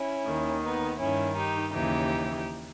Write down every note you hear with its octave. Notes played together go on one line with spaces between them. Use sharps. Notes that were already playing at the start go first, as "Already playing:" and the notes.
Already playing: C#4 E4
D#2 D#3
B3 D#4
G2 D#3 C#4 E4
D#4 G4
D#2 C#3 E3 D#4 G4